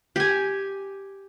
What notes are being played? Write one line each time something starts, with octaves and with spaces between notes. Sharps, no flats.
G4 G#5